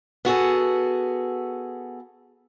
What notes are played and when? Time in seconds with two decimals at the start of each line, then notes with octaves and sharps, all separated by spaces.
0.25 B3 F#4 G#4 A4